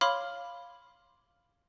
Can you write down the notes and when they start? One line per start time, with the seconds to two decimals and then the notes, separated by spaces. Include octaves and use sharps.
0.01 C#5 F5 B5 C6 D6 F6